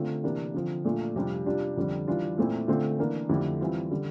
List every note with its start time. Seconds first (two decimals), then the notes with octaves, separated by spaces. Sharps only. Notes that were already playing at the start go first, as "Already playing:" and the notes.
Already playing: D3 A3 C4 F4
0.24 C3 E3 A#3 D4
0.54 D3 F3 C4
0.84 A#2 A3 D4 F4
1.15 F2 C3 G3 D4 F4
1.46 C3 G3 D4 F4
1.77 F2 D3 G3 D4
2.08 E3 G3 D4 F4
2.38 A#2 A3 C4 E4
2.68 D3 A3 C4 F4
2.98 E3 A#3 D4
3.29 F2 D3 A3 E4 G4
3.61 E3 G3 C4 F4
3.91 D3 G3